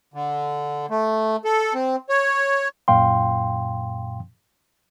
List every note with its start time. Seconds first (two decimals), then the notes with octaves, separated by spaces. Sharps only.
0.14 D3
0.90 A3
1.45 A4
1.74 C4
2.09 C#5
2.88 F#2 A#2 F5 G5 C6